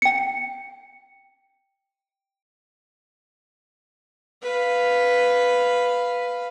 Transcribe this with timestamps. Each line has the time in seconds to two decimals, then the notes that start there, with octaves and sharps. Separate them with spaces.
0.02 G5 C#7
4.43 B4 F5